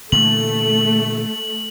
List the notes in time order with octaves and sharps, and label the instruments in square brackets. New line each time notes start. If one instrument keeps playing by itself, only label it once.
[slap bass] A#2 D3 E3 [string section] A3 [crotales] F#7